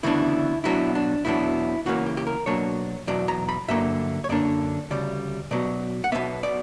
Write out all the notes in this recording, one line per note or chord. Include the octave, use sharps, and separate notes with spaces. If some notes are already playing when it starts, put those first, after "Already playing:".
D2 C#3 E3 B3 D4 E4
B2 F#3 B3 D4 E4
D4
E2 B2 F#3 B3 D4 E4
C#2 C#3 E3 A#3 C#4 F#4
G4
G4
A#4
B2 F#3 A#3 D4 C#5
E2 B2 F#3 D5
A#5
B5
G2 D3 F#3 A#3 E5
C#5
F#2 D3 A#3 D4 D5
D2 C#3 G3 D5
B2 F#3 B3 D5
F#5
B1 B2 F#3 B3 E5
D5